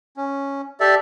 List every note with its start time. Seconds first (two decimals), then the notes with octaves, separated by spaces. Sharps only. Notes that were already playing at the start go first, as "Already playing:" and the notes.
0.17 C#4
0.80 G4 A4 D5 E5